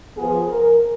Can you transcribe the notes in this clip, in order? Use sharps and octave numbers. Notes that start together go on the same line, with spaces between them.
F3 B3 G#4
A#4